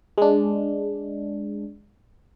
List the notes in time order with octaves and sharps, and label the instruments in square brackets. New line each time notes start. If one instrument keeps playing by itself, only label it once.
[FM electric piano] G#3 D4